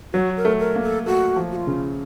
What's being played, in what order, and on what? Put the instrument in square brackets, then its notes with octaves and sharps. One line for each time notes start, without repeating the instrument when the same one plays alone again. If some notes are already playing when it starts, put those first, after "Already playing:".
[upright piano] F#3 [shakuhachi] F#4
[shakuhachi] A#4
[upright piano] A3
[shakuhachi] A#4
[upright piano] A#3
[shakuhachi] A4
[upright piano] A3 [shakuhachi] F#4
[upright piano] F3
[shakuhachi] F#4
F4
[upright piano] C#3